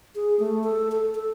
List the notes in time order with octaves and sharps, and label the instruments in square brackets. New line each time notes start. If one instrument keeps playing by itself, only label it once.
[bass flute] G#4
A3
A4
A4
A4